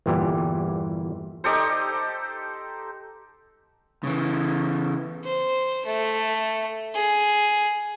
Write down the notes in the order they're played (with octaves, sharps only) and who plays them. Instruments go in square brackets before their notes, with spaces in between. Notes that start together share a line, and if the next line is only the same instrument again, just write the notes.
[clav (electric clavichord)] G1 E2 A#2 E3 G4
[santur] D#4 G4 A4 C5
[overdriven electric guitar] C#3 E3
[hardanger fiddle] C5
A3
G#4